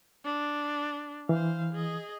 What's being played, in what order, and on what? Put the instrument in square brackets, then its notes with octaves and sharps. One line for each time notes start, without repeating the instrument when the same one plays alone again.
[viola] D4
[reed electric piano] E3 [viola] C5 F5
[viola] G#4 D#5